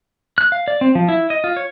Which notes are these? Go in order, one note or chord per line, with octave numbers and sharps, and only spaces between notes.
F#6
F5
D5
C4
F3
E4
D#5
F4
C#5